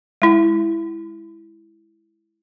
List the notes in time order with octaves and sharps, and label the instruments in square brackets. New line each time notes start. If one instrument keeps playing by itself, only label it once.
[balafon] G#3 E4